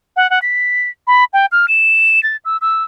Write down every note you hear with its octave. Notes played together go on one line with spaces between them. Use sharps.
F#5
F#5
B6
B5
G5
F6
E7
A6
E6
E6